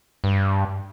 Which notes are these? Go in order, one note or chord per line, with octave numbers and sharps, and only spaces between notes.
G2